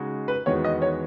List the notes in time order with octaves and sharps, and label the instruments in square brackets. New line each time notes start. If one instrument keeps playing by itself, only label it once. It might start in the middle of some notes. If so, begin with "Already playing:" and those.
Already playing: [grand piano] C#3 G#3 D#4 F#4
[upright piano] B4
[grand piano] E2 D#3 G#3 B3 F#4 [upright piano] C#5
[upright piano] D#5
C#5